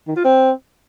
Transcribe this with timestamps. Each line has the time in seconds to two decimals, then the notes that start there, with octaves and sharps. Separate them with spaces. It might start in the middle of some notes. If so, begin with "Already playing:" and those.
0.07 D#3
0.16 F4
0.24 C4